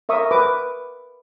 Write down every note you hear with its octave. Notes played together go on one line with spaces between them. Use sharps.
A#4 E5 C#6 D#6
B4 D6